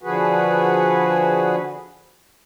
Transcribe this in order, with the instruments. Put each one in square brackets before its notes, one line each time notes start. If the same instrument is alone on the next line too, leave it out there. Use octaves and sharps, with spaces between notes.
[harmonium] D3 F3 F#4 G#4 B4